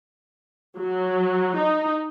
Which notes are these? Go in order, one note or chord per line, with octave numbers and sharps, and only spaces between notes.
F#3
D#4